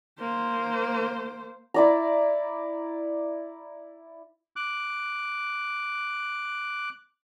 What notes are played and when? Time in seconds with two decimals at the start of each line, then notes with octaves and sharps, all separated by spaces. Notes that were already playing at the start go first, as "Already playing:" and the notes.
0.19 A#3 C5
1.74 E4 D5 A#5
4.56 D6 F#6